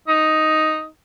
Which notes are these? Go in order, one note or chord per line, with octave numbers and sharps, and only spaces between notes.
D#4